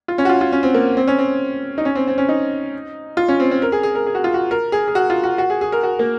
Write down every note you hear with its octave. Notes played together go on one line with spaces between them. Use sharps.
F4
C#4
F#4
F4
F4
C#4
C4
A#3
C4
C#4
C4
D#4
C#4
C4
C4
C#4
D#4
F4
C#4
C4
C4
A#4
G#4
G#4
A#4
G#4
F#4
F4
F#4
A#4
G#4
G#4
F#4
F4
F#4
F#4
G#4
G#4
A#4
F#4
A#3